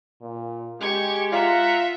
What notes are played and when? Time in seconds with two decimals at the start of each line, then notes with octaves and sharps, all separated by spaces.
0.21 A#2
0.81 G#3 G4 C#6 G#6
1.32 F4 E5 F#5 A#5